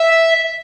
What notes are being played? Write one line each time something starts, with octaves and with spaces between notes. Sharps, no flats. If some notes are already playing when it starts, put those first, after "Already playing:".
Already playing: E5